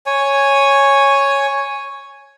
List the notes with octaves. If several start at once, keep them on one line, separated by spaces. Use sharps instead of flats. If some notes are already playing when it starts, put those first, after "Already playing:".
C#5 G#5